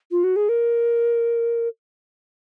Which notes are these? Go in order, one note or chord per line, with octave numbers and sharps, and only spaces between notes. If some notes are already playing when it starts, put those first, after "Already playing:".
F4
F#4
G#4
A#4